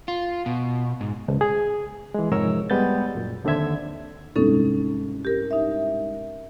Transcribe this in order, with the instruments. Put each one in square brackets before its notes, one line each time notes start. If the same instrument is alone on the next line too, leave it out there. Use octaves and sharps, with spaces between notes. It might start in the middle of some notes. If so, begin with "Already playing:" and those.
[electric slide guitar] F4
B2
G#2
[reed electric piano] C#2
G#4
E3 G#3
F2 G#2 C3 A#4 C#5 E6
G3 G#3 B3 B4 G6 A6
F#2 A#2
D#2 D3 C4 E5 G#6
[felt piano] C2 G#2 [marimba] C#4 D#4 A4
[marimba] G4 A#4
D#4 E5